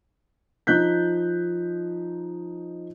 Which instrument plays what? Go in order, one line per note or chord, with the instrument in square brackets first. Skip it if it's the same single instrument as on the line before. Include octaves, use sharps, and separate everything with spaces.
[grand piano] F3 D#4 F#6 G6 B6